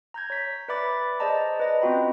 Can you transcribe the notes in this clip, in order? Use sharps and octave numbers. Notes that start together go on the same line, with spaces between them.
A#5 G6 G#6
C#5 B6
B4 D5 E5 B5 D6 A6
G#4 C5 D5 D#5 A5 A#5
B4 D#5 A#5
C4 C#4 F4 F#4 G5 B5